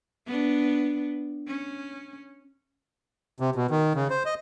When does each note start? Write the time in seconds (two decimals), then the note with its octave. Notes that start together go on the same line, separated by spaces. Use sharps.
0.26 B3 D4
1.48 C#4
3.40 C3
3.55 B2
3.71 D#3
3.95 C#3
4.10 C5
4.25 D#5